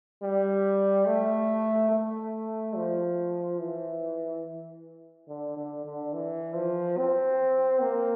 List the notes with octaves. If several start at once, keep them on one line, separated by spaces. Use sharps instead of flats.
G3
A3
A3
F3
E3
D3
D3
D3
E3
F3
C4
A#3